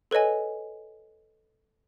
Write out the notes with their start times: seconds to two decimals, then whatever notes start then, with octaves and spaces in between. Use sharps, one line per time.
0.11 A4 B4 C#5 D#5 G#5